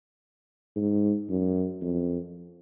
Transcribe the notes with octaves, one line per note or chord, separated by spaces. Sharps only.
G#2
F#2
F2